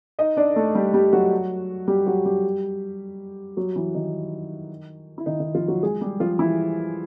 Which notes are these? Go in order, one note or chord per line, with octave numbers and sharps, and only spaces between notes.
D#4 D#5
D4 D5
A3 A4
G3 G4
G3 G4
F#3 F#4
G3 G4
F#3 F#4
G3 G4
F#3 F#4
E3 E4
D#3 D#4
E4
D#3 D#4
D#3 D#4
F3 F4
F#3 F#4
G#3 G#4
G3 G4
F3 F4
E3 E4